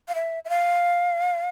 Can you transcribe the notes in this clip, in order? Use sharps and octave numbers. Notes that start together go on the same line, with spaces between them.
F5
E5
E5
F5